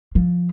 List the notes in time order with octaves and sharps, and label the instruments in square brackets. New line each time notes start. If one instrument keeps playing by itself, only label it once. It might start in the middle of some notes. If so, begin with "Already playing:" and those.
[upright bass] F3